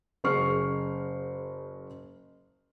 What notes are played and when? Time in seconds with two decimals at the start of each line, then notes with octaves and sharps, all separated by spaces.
0.24 F#1 C#3 G#4 C#6 F6 C7